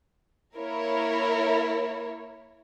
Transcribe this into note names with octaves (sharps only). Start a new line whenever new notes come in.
A#3 E4 A#4 C#5